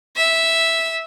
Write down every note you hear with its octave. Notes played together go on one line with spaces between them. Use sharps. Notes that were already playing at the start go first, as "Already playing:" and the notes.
E5